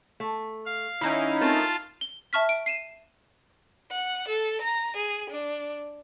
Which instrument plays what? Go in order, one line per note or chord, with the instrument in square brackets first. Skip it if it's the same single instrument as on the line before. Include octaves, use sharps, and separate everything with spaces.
[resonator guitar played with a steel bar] A3
[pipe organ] F5
[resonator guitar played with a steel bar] D#3 [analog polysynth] C#4 D#4 E4
[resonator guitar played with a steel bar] A3 C4 A#4 [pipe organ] F4 F5 A5
[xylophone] G7
E5 A5 C#6 F6 B6
D7
C7 D#7 E7
[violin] F#5
A4
A#5
G#4
D4